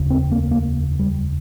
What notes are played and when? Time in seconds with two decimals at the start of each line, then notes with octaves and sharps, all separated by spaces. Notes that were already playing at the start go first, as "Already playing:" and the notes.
Already playing: F1 D#2 C#3
0.10 C4
0.31 A#3
0.51 A#3
0.99 G3